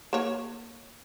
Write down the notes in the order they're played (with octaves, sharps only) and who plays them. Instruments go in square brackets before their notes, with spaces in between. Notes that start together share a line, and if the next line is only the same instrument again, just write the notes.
[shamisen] A#3 C#5